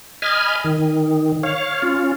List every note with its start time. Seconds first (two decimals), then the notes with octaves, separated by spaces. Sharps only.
0.22 D#5 G#5 B5 F6
0.64 D#3
1.43 C#5 F5
1.82 C#4 F4